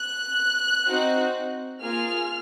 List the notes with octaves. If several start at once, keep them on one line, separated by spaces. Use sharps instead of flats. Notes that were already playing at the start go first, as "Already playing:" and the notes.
Already playing: F#6
C4 D#4 F#4
A#3 F4 G#4 F6